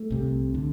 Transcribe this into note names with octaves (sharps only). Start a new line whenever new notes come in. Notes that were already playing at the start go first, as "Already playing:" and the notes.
Already playing: A3
C2 C3
D3